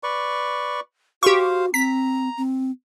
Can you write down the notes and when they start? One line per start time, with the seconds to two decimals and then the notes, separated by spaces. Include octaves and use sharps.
0.03 B4 D5 C#6
1.23 F#4 G4 C5 F5 C#6
1.74 C4 A#5 B6
2.38 C4